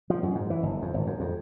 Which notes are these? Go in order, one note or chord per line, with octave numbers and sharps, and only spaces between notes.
F3
F#2
G#2
E3
G1
F2
G#1
F#2
F2